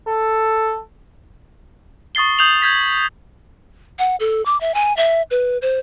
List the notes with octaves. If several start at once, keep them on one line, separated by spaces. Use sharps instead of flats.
A4
C#6 D#6 A6 C7 G7
D#6 G6 C7 F7 F#7
G6 G#6 B6
F#5
A4
D6
E5
G#5
E5
B4
C5